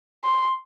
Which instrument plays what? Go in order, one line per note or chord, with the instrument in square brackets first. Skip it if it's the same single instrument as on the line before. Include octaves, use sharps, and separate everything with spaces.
[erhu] C6